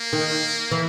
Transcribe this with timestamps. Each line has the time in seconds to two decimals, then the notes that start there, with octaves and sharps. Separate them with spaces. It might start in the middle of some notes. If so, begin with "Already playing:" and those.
Already playing: A#3
0.13 D#3
0.71 E3